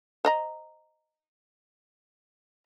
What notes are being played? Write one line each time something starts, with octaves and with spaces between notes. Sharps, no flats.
C5 D#5 A#5